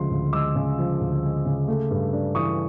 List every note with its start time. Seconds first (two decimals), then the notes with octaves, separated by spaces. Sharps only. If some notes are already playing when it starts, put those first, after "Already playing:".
Already playing: D2 C#3 F3 G#3 C6
0.11 D2
0.33 G#3 D6 E6
0.56 C#3
0.78 F3
1.01 D2
1.23 G#3
1.45 C#3
1.68 A3
1.91 G2
2.13 D4
2.35 E3 C#6 D#6